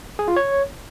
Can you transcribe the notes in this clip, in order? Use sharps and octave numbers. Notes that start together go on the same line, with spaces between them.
G#4
F4
C#5